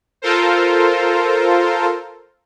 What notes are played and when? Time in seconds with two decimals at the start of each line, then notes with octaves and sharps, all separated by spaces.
0.22 F4 A4 A#4 C5